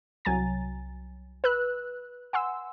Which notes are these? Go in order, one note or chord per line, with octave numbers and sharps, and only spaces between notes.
C2 F#3 G#5 A#5 A6
B4 E6 F#6
F#5 G#5 C6 E6